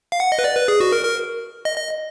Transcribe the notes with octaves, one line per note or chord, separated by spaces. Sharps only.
F5
F#5
D#5
B4
D5
B4
G#4
F#4
A#4
A#4
D#5
D#5